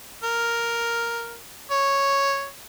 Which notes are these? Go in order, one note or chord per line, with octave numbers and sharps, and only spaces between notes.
A#4
C#5